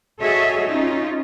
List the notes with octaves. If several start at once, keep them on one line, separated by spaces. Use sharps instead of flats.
F#4 G#4 A4 C#5 D#5 E5
C#4 D#4 F4